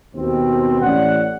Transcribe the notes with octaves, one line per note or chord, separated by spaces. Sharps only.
D#2 B2 C4
A1 C#4 D5 F#5